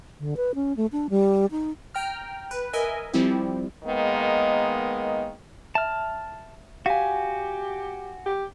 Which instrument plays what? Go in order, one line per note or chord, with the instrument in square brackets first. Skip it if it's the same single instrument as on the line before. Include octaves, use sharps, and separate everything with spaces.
[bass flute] D3
B4
C#4
A3
D4
G3
D#4
[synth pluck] G5 A#5 F6
B4
A#4 D#5 E5 G#5
F3 G3 C4 E4 G4
[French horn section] D#3 G#3 A#3 B3
[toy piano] E5 [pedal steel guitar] A5 F6
[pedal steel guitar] F#4 G#5 [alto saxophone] G4 [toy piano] F5
[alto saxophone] G4